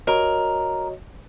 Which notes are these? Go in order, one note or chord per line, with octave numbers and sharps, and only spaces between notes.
F#4 A#4 C#5 D#5